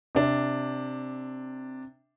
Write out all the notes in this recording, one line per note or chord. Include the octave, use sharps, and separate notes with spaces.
C3 D4